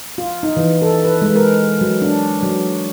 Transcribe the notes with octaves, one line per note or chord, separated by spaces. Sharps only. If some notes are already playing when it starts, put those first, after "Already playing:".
F4
D#4
E3
A4
B4
G#3
A#4
F#3
D4
F#3